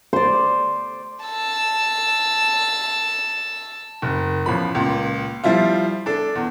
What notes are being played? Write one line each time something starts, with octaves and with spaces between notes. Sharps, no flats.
C5 D5
A5 E6
F#1
A1 F3 B5
C#2 A#2
F3 G3 E4 F4
D4 A4
E2